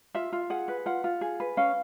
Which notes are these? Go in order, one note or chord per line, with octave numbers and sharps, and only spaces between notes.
F4 E5
F4
G#4 F#5
B4
F4 F#5
F4
G#4
B4
C#4 F5